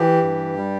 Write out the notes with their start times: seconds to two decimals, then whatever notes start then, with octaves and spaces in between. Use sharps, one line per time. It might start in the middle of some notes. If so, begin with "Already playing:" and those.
Already playing: E3 G4
0.23 G2
0.57 G3